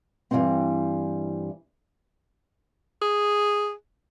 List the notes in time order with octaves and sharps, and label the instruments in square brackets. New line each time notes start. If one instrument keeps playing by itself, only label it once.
[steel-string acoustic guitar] G2 E3 F3 G3 G#3 C4
[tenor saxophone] G#4